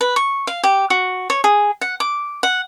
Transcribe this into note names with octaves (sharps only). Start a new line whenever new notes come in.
B4
C#6
F5
G4
F#4
C#5
G#4
F#5
D6
F#5